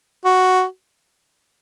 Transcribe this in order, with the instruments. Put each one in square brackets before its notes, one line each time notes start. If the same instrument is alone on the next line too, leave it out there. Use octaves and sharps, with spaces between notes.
[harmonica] F#4